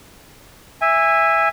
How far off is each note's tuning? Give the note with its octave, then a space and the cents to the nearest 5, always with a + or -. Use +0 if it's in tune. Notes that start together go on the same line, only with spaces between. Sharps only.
E5 +0 G#5 -20